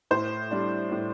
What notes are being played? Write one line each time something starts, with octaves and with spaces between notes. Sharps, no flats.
A2 C5
G3 D4
A2